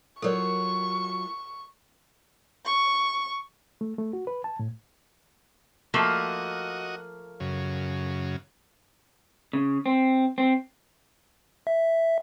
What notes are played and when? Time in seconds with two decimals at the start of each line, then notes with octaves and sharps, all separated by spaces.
0.22 F#3 F4 A4 A#4 C#5 C#6
2.66 C#6
3.81 A3
3.98 A3
4.13 F#4
4.27 B4
4.44 A5
4.59 A2
5.94 F3 A3 A#3 F#4 D#5
7.40 F#2 C#3
9.53 C#3
9.86 C4
10.38 C4
11.67 E5